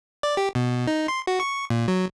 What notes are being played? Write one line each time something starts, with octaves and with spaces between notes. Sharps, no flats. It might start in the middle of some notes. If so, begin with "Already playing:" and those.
D5
G4
B2
D#4
C6
F#4
C#6
A#2
F#3